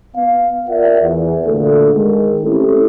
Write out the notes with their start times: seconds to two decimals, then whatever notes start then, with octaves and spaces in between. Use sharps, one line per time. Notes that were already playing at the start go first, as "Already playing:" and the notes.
0.16 B3 F5
0.69 F4 A#4 D5 E5 F#5
1.01 E2
1.46 D2 A#2 D3 A3 A4
1.92 G#2 D#3 G#3
2.43 A3 C4 C#4 E4 G4 A4